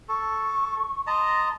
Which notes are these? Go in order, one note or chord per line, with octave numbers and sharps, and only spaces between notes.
A4 C#6
D#5 A5 A#5 C6